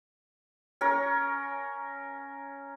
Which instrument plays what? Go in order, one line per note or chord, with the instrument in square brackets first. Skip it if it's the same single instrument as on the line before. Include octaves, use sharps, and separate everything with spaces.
[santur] C#4 A#4 C#6